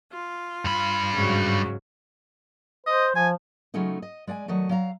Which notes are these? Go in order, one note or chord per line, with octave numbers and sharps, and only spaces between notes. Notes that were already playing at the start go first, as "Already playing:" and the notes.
F4
G2 B5
G#2 C#3 F#3
C5 D#5
F3 G#5
C#3 F#3 G#3 A3 C#4 D#4
D#5
G#3 D5 F#5 G#5
D#3 F#3 A3 D#5
F#3 F5 A#5